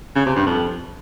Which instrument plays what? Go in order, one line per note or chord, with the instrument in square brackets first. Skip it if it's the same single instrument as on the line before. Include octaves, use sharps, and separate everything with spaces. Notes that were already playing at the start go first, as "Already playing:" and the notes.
[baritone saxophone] C#3
C3
G2
F2